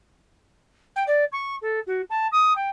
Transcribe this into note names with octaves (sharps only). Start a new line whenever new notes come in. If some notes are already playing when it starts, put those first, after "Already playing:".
G5
D5
C#6
A4
F#4
A5
D#6
G5